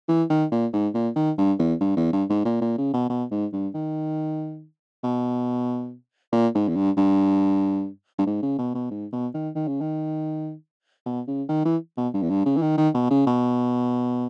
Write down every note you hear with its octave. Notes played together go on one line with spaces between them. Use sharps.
E3
D#3
A#2
G#2
A#2
D#3
G2
E2
G2
E2
G2
G#2
A#2
A#2
C#3
B2
B2
G#2
G2
D#3
B2
A#2
G#2
E2
G2
G2
G2
G#2
C#3
B2
B2
G#2
B2
D#3
D#3
C#3
D#3
B2
C#3
D#3
E3
B2
G2
E2
G2
C#3
E3
D#3
D#3
B2
C#3
B2